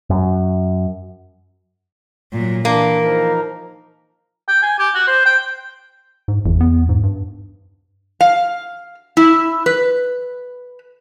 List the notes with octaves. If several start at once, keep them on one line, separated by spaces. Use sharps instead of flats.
F#2
A#2 F#3
E3 A#3 D4
F3 D#4 A#4
G5
G#5
G4
F#4
C5
G5
G#2
G1 E2
B3
G#2
G2
F5
E4
B4